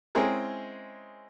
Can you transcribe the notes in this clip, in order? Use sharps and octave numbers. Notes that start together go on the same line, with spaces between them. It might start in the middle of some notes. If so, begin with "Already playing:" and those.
G#3 C4 C#4 E4 G#4 A#4